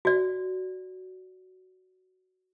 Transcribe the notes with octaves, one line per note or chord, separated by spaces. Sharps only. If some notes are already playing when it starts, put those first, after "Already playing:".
F#4 D5